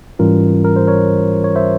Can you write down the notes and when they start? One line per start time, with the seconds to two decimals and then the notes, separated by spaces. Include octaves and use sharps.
0.19 G#2 E3 G3 C#4 F4 A#4
0.65 A#4
0.76 C5
0.87 A#4 C#5
1.44 C#5
1.56 C5 E5